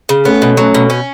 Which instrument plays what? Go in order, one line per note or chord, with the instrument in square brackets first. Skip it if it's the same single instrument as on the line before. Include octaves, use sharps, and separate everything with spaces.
[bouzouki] C#3
[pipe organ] A3 C#4 [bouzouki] B3
[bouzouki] B2
[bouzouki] F#3 [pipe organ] A3 C#4
[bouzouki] B2
C#4